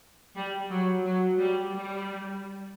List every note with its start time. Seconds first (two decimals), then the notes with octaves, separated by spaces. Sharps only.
0.35 G3
0.70 F#3
1.05 F#3
1.39 G3
1.74 G3